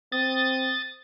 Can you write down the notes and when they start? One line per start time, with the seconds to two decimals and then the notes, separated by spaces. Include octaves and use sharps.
0.12 C4 D#6 A6